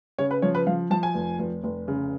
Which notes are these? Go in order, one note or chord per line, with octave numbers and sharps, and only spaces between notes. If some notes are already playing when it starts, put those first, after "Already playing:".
C#3 C#5
B4
F3 C#5
B4
F3 F5
F3 A5
G#5
F1
F1
F1
C#3